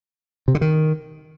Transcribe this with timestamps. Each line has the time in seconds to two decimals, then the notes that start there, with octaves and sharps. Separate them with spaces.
0.48 C3
0.55 D3
0.61 D#3